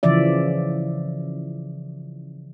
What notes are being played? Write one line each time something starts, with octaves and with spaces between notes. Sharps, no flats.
C#3 E3 F3 D5 E5